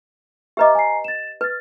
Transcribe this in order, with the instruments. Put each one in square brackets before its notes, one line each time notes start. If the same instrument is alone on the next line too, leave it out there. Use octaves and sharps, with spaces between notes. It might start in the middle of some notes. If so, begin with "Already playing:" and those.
[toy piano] G4 B4 D#5 [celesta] E5 A#5 D6
[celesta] G#5 A#5 C7
A6 E7
[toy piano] B4 [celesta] F6 A6